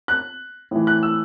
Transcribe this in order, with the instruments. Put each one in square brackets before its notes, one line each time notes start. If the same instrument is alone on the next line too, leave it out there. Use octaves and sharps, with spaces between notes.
[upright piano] F#6
A2 E3
F#6
E6